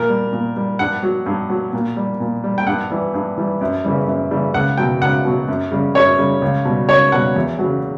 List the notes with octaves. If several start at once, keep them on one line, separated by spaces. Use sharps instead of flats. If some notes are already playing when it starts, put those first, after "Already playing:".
Already playing: A#2 A#4
G3
A#2
G3
G2 F#5
F#3
G2
F#3
A#2
G3
A#2
G3
G5
G2 F#5
E3 G3
G2
E3 G3
F#2
C#3 E3 G3
F#2
C#3 E3 G3
C#2 F#5
B2 F#3 G5
C#2 F#5
B2 F#3
F#2
C#3 G3
F#2 C#5
C#3 G3
C#2
B2 G3
C#2 C#5
B2 G3 F#5
E2
C#3 F#3